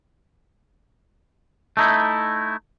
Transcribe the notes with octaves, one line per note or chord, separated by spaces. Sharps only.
A3 D#4 E4